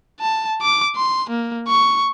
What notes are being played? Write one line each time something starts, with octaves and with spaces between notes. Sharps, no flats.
A5
D6
C6
A#3
C#6